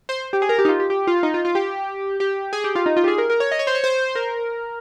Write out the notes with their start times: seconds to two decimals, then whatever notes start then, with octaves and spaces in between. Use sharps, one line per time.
0.09 C5
0.33 G4
0.42 G#4
0.49 A#4
0.59 G4
0.65 D#4
0.68 F4
0.80 G4
0.90 G4
1.07 F4
1.23 D#4
1.34 F4
1.45 F4
1.55 G4
2.20 G4
2.53 G#4
2.64 G4
2.75 F4
2.86 D#4
2.97 F4
3.04 G4
3.08 G#4
3.18 A#4
3.30 A#4
3.40 C#5
3.52 D#5
3.59 C#5
3.67 C5
3.75 C#5
3.84 C5
4.15 A#4